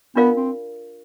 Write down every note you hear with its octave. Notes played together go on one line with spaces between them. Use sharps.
B3 D4 F4 A#4 D5 F5
C4